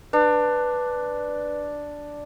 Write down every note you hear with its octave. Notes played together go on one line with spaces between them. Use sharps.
D4 B4